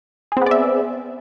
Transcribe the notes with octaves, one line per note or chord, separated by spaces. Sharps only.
B3 C4 G#4 D5 E5